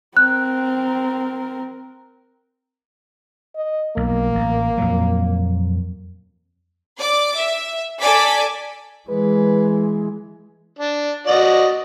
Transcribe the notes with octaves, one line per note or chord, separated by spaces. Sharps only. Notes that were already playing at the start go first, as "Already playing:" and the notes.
C4 A#4 F#6
D#5
B1 A#3
A1
F2 A#2 F#3
D5 D6
E5
A4 D5 G#5 D6 B6
E3 G#3 B4
D4
F#4 D5 D#5